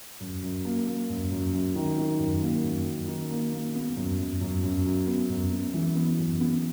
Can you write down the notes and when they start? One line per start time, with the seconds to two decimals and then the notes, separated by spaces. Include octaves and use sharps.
0.20 F#2
0.43 F#2
0.65 A#3
0.87 A#3
1.09 F#2
1.31 F#2
1.53 F#2
1.76 D#3
1.98 D#3
2.19 F#2
2.42 A#3
2.64 F#2
2.86 F#2
3.08 D#3
3.31 A#3
3.53 A#3
3.75 B3
3.97 F#2
4.19 F#2
4.41 F#2
4.63 F#2
4.86 F#2
5.07 B3
5.29 F#2
5.51 B3
5.74 E3
5.95 B3
6.19 F#2
6.40 B3